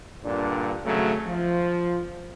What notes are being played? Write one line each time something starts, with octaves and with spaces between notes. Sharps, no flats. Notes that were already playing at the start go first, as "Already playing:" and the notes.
G2 A#2 D3 D4
G#1 C#3 F#3 A3
F3